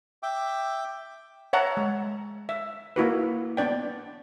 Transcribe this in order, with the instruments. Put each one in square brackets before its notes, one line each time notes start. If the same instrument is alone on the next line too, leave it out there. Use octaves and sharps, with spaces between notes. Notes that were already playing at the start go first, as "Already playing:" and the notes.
[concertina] E5 G5 D6
[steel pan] C#5 E5 F#5 A5 A#5
G#3
E5
A#3 E4 F#4 B4
B3 D4 D5 G5